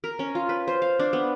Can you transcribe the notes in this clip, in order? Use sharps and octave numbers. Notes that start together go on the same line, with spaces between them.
A#4
C#4
F4
B4
C5
F5
D4
B3